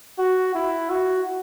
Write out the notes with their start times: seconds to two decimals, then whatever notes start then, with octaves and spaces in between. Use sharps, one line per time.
0.19 F#4
0.55 E4
0.90 F#4